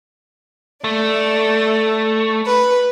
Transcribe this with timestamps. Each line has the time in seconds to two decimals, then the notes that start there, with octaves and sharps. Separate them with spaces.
0.84 A3 D5
2.45 B4